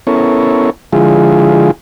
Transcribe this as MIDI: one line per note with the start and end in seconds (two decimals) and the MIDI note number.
0.07 0.70 59
0.07 0.70 61
0.07 0.70 64
0.07 0.70 69
0.07 0.70 70
0.07 0.70 73
0.93 1.71 50
0.93 1.71 53
0.93 1.71 56
0.93 1.71 64
0.93 1.71 65
0.93 1.71 68